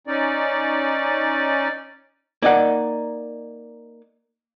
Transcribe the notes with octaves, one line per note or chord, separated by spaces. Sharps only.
C#4 D#4 D5
A#3 D#4 D5 F#5